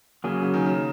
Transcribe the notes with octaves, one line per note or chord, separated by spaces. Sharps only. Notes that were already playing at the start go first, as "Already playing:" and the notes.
C#3 F#3 A#3 C#4 G#4
C#3
D#3
C#3